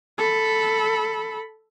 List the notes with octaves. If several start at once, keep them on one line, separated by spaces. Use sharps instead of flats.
A4 B5